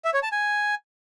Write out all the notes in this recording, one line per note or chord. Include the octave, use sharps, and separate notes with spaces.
E5
C#5
A5
G#5